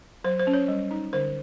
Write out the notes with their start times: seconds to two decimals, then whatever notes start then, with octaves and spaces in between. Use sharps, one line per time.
0.24 F#3 C5
0.39 C5
0.47 C#4
0.54 C#5
0.68 G3
0.91 D#4
1.13 D3 C5